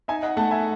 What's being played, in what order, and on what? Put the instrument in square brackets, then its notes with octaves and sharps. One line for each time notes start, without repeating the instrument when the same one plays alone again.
[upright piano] D#4 [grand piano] E5 G#5
[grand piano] D#5 F#5
[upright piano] A3 [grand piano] F#5 A5
[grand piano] E5 G#5